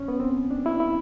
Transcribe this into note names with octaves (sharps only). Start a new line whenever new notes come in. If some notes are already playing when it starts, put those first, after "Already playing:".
Already playing: C#4
B3
C4
D4
E4
E4